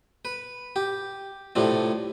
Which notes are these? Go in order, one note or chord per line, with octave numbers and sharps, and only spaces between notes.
B4
G4
A2 C3 F3 D4